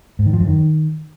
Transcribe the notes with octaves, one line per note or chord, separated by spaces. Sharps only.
G#2
D#3
F3
F#2
D#3